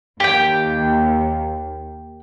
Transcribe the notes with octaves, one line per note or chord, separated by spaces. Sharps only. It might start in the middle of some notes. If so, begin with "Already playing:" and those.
D#2 G4 G5